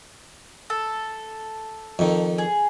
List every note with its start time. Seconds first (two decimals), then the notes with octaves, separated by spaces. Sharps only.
0.70 A4
1.99 F2 D#3
2.38 G#4